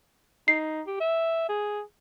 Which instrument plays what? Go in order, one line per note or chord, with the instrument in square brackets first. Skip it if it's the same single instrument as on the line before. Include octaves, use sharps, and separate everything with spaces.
[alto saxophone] D#4 [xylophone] C7
[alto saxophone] G4
E5
G#4